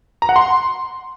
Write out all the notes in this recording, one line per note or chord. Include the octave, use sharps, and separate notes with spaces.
A#5
F#5
C6